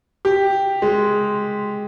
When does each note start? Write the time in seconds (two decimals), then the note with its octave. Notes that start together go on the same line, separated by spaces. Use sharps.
0.25 G4
0.82 G#3